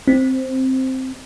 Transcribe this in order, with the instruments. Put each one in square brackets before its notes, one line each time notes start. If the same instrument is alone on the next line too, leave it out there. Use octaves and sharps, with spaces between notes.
[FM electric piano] C4